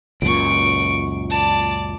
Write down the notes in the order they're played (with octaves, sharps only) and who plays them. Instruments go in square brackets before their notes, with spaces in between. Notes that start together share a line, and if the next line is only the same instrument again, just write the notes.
[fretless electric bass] C#2 F#2 A#2 [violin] C#6 D7
[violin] D5 A5